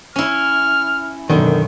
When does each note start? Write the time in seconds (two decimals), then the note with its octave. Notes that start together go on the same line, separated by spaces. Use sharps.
0.16 C#4 E4 F6
1.30 F#2 B2 D3 D#3